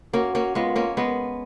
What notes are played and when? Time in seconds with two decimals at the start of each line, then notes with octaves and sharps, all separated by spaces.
0.13 A#3 C#4 F#4
0.35 A#3 C#4
0.55 G#3 B3 F4
0.76 A#3 C#4
0.97 G#3 B3